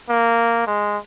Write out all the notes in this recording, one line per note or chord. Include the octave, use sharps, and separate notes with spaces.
A#3
G#3